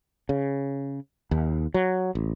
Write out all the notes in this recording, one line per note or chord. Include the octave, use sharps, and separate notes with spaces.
C#3
D#2
F#3
A1